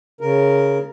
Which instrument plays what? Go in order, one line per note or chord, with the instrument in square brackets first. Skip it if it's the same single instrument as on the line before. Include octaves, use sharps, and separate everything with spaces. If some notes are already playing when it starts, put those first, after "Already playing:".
[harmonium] C#3 A#4